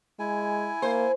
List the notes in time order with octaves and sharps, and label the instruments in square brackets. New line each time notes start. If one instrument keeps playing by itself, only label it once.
[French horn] G#3 [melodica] E4 G#5
[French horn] A#3 [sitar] C5